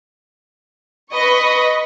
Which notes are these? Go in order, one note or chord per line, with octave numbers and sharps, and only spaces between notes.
B4 D#5 B5 C#6